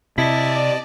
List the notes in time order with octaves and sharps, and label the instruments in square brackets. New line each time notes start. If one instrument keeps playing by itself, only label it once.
[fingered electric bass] C3 [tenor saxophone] E4 [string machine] D5 [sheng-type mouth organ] D#5 A5